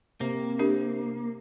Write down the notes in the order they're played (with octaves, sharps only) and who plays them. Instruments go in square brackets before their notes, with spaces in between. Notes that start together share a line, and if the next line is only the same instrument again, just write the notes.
[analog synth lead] C3 [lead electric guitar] A#3
[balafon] D4 G4 A#4